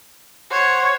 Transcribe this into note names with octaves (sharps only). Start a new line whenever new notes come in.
C5 C#5 F#5